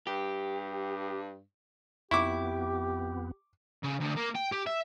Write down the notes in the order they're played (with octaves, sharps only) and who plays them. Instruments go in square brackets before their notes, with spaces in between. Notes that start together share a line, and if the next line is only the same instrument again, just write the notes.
[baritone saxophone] G2 [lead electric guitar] G4
[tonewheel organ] F2 B3 [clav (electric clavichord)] E4 [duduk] G4 [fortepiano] C#6 D6
[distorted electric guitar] C#3
D2
A#3
G5
G4
E5